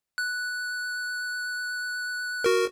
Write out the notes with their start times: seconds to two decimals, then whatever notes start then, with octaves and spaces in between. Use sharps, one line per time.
0.18 F#6
2.44 F#4 A#4